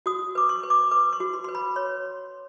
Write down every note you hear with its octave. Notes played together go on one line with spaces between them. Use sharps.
F#4 D#6
B4 D6
C#6
B4
D6
B4 D6
C#6
F#4
C6
B4 C6
B5
C#5 C6